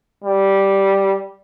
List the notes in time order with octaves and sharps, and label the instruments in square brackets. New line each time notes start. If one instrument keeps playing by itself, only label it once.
[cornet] G3